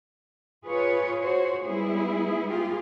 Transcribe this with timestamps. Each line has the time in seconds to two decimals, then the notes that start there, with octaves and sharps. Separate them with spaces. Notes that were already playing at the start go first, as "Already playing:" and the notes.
0.66 F4 G#4 B4 C#5
1.23 F#4 C5 C#5
1.66 G3 G#3 B3 E4 G#4
2.48 F4 G4 G#4